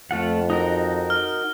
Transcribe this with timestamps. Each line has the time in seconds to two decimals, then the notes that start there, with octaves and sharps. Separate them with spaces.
0.11 F2 A3 F4 F#5
0.50 D#4 F#4 A#4
1.10 F6